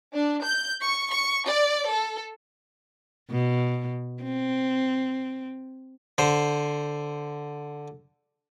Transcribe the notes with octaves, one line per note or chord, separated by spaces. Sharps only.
D4
G6
C#6
C#6
D5
A4
B2
C4
D3 C5